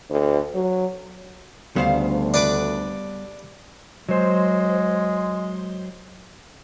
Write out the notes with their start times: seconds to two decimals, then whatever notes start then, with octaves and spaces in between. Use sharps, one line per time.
0.10 D2
0.54 F#3
1.76 D2 C#3 G3 B3 C5 F5
2.34 D4 B4 D6
4.09 F#3 G#3 C5